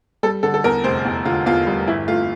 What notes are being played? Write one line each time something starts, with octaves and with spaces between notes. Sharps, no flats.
G3 A4
D3 A4
A4
E2 A#4
F1 C5
E2
D3 F4
E2 F4
G3
G1 E4
A3 F4